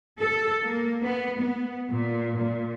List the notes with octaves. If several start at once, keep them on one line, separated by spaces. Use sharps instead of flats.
A4
A#3
B3
B3
A#2
A#2